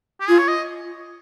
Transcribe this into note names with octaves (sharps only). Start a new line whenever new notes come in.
G4
F4 G#4
C#5
D#5